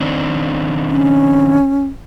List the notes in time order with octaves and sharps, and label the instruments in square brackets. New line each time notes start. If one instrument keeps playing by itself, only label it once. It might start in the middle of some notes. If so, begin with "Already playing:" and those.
[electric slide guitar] D#3 C4 D4
[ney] C#4